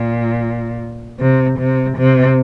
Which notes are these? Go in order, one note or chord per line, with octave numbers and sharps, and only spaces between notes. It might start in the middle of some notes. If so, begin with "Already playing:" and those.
Already playing: A#2
C3
C3
C3